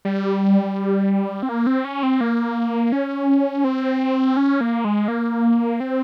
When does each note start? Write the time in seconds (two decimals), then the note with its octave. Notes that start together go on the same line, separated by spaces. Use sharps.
0.05 G3
1.42 C4
1.49 A#3
1.67 C4
1.85 C#4
2.03 C4
2.21 A#3
2.92 C#4
3.64 C4
4.37 C#4
4.61 A#3
4.85 G#3
5.08 A#3
5.80 C4